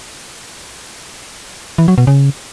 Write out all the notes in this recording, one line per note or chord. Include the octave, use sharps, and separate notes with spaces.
E3
F#3
B2
C#3